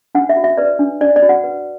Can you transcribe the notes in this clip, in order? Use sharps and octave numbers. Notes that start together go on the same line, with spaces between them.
D4 F#5
E5
F#4
E5
B4 D5
D4
D4 D5
D5
F#4
F#5
B4